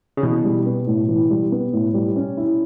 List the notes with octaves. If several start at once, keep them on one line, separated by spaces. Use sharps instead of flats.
C#3
B2 E3
G3
B3
A2
E3
G3
B3
A2
G3
C#4
E4